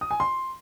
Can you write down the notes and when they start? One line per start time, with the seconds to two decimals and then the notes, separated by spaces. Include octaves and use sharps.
0.01 D#6
0.11 G#5
0.20 C6